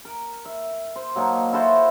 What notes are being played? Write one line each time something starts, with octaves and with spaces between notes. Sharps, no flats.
A#4
E5
C5
F#3 A#3 D#4 A5
E4 F#4 A4 C5